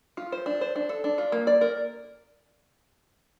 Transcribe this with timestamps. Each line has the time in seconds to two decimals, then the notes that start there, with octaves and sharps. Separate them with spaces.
0.17 F4
0.32 C5
0.46 D4
0.61 C5
0.76 D4
0.89 A4
1.04 D4
1.18 F4
1.32 A#3
1.47 D5
1.61 A#4